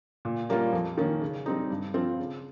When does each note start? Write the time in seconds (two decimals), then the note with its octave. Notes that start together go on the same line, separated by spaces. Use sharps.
0.25 A#2
0.49 G3 A#3 C#4 F4
0.73 F2
0.98 D#3 A#3 C#4
1.21 C#3
1.46 G3 C4 D#4
1.70 G2
1.94 F3 C4 F4
2.19 C#3